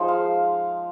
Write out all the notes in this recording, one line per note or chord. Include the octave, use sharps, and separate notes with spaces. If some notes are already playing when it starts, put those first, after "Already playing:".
Already playing: F3 G#3 D#4 C5
F5